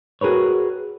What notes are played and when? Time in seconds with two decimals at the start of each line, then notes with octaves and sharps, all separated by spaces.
0.21 F#4 G#4 A#4 B4 C#5